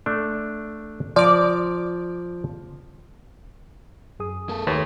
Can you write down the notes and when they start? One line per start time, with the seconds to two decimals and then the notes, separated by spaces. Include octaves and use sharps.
0.06 A3 D4
1.16 F3 D5 A#5 D6
4.20 F#2 G#4 D#6
4.49 A#3 A4
4.67 D#2 A3 B4 C#5